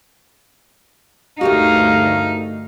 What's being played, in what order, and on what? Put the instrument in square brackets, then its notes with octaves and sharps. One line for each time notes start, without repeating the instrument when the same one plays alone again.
[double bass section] D2 G2 A3 [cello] D#4 [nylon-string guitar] F#4 G4 A#4 [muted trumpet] F5